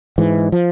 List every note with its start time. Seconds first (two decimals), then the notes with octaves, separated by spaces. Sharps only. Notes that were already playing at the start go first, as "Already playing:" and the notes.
0.18 G#2 E3
0.52 F3